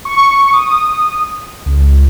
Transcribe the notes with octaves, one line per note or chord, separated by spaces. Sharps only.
C#6
D#6
C#2